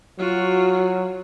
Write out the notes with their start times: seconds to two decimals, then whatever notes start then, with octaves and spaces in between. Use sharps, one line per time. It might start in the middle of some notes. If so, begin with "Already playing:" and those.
0.19 F#3 F4 F#4